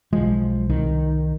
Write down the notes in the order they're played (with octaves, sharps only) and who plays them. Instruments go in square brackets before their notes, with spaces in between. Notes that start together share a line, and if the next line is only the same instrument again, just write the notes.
[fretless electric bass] B1 F3 [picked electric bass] G#3
[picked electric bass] C2 [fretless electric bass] D#3